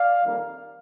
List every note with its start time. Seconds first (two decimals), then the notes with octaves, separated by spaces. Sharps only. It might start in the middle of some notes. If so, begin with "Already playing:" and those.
Already playing: D5 F5
0.22 F2 D#3 G3 A#3 D#4